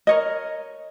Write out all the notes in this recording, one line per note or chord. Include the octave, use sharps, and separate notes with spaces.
A#4 C#5 D#5